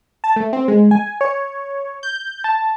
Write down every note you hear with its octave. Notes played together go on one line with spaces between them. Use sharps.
A5
A3
C4
G#3
G#5
C#5
G6
A5